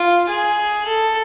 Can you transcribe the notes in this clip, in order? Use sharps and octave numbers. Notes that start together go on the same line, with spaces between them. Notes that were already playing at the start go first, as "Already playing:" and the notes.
Already playing: F4
G#4
A4